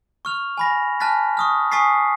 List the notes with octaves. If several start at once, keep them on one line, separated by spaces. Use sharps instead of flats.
C#6 F6 F7
G#5 B5 A#6
G#5 A5 F6 F#6 A6 B6
C#6 D#6 F6
G#5 C#6 D#6 A6 B6 C7